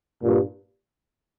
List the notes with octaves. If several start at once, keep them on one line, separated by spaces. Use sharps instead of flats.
G2 A#2